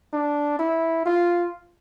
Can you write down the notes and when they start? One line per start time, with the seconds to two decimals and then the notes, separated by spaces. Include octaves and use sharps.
0.13 D4
0.59 E4
1.05 F4